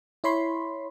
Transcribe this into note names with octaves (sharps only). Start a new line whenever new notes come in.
E4 C#5 B5 C6